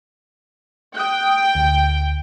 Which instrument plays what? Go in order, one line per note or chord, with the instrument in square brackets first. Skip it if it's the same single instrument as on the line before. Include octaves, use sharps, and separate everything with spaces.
[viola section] G5 [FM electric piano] D#6 F#6
[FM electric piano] D2